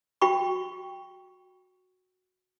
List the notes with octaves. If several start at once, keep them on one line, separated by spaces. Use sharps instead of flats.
F#4 G5 B5 C#6